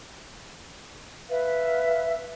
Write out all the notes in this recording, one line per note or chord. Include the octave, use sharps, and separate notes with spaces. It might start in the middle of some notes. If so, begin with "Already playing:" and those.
B4 E5 F5